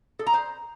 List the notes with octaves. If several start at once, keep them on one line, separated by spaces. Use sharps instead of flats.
A4
A#5
C5